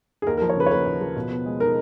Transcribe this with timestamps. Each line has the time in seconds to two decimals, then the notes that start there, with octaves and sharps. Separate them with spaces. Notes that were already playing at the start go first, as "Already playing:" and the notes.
0.22 G#4
0.27 D#2 A#4
0.37 A#4
0.42 F3
0.49 C#5
0.56 C#3 B4
0.66 C#5
0.71 A#3 B4
0.86 D#2
1.01 F3
1.16 B2
1.31 B3
1.46 G#3
1.60 D#4 A#4